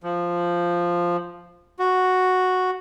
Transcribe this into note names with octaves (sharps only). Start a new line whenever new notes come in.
F3
F#4